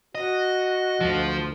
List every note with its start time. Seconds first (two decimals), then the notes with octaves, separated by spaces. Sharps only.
0.15 F#4 D#5
1.00 D2 F3